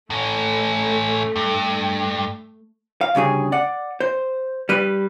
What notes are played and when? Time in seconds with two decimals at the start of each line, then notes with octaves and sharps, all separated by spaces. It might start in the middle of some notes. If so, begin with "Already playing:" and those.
0.10 A2 A3 C#4
1.36 G2
3.01 F5
3.15 D2 G2 C#3 G#4
3.52 D5 F#5
4.00 C5
4.69 G3 B4